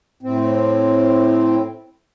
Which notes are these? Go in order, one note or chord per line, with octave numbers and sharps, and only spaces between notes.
A2 C4